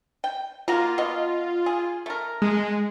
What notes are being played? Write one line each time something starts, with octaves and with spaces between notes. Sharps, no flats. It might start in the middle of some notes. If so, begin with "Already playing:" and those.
G5
A#3 F4 F#4 A#5
B2 B3 D#5
G#4
A3 A#4
G#3